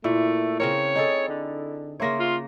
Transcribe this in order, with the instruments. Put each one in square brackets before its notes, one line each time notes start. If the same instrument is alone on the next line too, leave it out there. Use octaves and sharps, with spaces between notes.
[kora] A#2 [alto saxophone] A3 [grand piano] E4
[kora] C#3 C4 A#4 [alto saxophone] C#5
[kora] D#4 G#4 A4
[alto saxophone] D3
[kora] C#3 A#3 C#5 [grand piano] E5 C6 A#6
[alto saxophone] F4